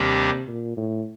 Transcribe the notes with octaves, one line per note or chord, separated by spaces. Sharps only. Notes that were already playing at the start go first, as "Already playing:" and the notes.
Already playing: D#2 C3 D#3 G3 D4 G4
A#2
A2